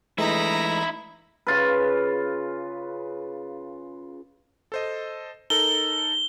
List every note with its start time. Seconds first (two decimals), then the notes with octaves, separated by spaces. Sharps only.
0.18 E3 G#3 A3 D#4 E4 A#5 B5
1.47 C#3 F4 B4
4.72 A4 C5 D#5
5.50 D#4 A4 A#4 G7